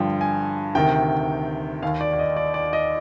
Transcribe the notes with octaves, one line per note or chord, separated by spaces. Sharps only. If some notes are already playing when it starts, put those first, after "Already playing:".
Already playing: G2 D3 F3 G5
G#5
D2 C3 D#3 G5
D#2 D#3 F5
D5
D5
D#5
D5
D5
D#5